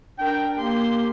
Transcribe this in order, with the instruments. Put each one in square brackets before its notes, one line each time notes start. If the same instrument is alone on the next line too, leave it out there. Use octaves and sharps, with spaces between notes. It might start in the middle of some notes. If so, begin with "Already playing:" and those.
[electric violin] D4 A#4 [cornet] G5
[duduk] A#3 [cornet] G4 [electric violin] C6